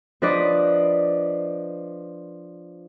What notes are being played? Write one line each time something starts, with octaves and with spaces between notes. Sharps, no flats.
F3 D4 B4 D5 D#5